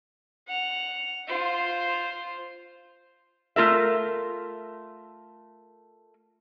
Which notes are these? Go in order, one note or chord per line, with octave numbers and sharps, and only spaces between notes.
F#5 F7
F4 C5
A3 F4 A#4 E5